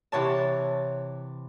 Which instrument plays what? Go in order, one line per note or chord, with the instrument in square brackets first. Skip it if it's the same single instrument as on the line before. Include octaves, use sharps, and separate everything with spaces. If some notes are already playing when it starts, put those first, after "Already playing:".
[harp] C3 E3 C#5 A5